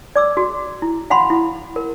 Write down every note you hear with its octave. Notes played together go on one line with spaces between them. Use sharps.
D5 D6 E6
F#4
E4
F5 F#5 B5 C6
E4
A#4